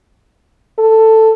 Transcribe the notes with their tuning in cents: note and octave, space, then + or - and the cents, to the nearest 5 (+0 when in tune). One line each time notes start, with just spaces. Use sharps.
A4 +10